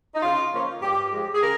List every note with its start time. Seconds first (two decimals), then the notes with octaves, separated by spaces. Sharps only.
0.15 D#4
0.22 C#3 F4
0.52 F3 A#3 C#4
0.82 G2 G4
1.12 F3 G#3
1.34 G#4
1.41 C#3 A#4